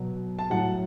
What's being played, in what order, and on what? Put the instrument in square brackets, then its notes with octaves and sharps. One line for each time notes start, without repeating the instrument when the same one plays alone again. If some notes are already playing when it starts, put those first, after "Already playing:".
Already playing: [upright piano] B2 F#3
A5
A2 F#3 F#5